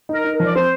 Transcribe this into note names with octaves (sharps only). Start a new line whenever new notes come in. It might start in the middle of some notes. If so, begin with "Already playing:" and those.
D#4
A#4
D#4
A#4
F3
D5
C4 C5